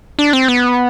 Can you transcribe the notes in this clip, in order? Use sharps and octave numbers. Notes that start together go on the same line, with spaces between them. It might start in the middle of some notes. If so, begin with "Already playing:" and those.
D4
C4
B3